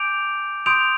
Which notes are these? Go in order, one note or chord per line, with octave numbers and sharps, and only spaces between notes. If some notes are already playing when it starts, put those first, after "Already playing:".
Already playing: G#5 D6 G6 D7 F7
C6 D#6 G6 D7 F7